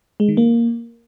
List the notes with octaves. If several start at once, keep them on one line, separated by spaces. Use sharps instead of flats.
G#3
D#3
A#3